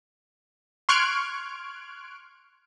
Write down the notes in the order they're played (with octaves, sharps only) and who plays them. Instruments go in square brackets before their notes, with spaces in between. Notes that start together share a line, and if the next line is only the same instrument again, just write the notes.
[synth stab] C6 C#6 F6 F#6 G#6 D7